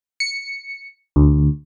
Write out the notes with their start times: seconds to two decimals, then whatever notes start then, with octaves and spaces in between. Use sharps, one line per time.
0.20 C#7
1.16 D2